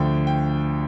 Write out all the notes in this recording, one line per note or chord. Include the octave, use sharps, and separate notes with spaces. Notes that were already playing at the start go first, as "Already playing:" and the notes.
Already playing: D2 D3 F3 G5
G5